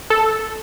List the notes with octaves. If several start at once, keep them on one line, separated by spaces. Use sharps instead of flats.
A4